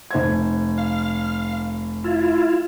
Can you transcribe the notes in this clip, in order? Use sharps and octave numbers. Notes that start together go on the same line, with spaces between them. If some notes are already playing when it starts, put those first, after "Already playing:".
F1 C5 G#6
F5
E4 F4